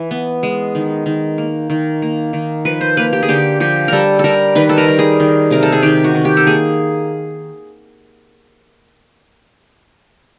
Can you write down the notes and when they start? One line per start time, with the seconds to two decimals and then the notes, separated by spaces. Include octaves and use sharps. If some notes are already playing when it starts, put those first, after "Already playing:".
Already playing: E3
0.11 B3
0.43 G#3
0.75 D#3
1.06 D#3
1.38 A#3
1.70 D#3
2.02 A#3
2.33 D#3
2.65 F3 B4
2.81 C5
2.97 A#3 B4
3.13 G4
3.23 G#4
3.28 D3 G4
3.60 F3 G4
3.88 G3 A4 A#4
4.19 G3 A4 A#4
4.55 D#3 B4
4.69 A4
4.78 A#4
4.88 G3
4.99 G#4
5.20 D#3
5.51 C3 A#4
5.63 A4
5.72 G#4
5.83 D#3 G4
6.04 F#4
6.15 D#3
6.25 G4
6.37 A4
6.46 A#3 G#4